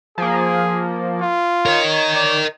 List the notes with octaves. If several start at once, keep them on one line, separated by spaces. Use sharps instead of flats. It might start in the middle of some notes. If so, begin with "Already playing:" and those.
F3 A#3 G#4
F4
A#4 C#5 D#5
D5